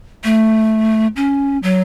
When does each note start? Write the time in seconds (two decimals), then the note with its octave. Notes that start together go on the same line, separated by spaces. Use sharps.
0.24 A3
1.16 C#4
1.63 F#3